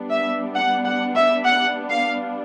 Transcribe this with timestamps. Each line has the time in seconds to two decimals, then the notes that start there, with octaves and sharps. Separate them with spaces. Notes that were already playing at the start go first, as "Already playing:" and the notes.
Already playing: G3 B3 D4
0.09 E5
0.54 F#5
0.84 F#5
1.14 E5
1.44 F#5
1.90 F5